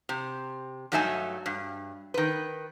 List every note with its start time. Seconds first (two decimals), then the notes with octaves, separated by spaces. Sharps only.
0.09 C3
0.92 G2 F#3 A3 D#4 E5 G#5
1.46 G2
2.14 D#3 B4